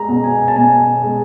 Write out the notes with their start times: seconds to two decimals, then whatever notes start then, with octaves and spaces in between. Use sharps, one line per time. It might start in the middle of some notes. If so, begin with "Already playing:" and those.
Already playing: G#3 A#5
0.09 B2
0.24 G#5
0.48 A5
0.56 B2 G#5
1.03 G#3